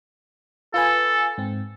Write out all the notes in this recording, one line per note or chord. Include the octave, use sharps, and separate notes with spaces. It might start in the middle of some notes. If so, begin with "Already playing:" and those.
F4 A4 B4 G#5
G#2 C4